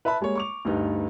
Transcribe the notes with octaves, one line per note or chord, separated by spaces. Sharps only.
B4 E5 A5 B5
G3 G#3 A#3 C#5
C#6 D6 F7
D2 G2 D#4 B4